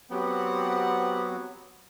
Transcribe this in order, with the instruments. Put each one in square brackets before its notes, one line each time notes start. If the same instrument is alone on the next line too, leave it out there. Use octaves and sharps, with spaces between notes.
[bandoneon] F#3 [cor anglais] B3 [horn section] C4 F#5 [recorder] G4